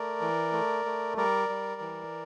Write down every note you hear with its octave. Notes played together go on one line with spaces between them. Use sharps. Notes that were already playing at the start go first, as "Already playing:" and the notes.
Already playing: A3 A#4 D5
E3
A3
A3
G3 A#4 D5
G3
E3